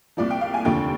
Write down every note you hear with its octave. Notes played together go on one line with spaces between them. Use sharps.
C2 A#2 F3 D5
G5
F5
G#5
F1 D#2 D3 F3 G5